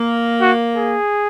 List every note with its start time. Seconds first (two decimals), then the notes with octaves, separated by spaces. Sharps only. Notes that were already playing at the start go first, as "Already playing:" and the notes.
Already playing: A#3
0.41 F#4
0.76 G#4